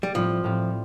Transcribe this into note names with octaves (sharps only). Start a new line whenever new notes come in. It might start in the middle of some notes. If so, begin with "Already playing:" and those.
G3
A2 F3 G3 C4 F4
A2 G3 C4 F4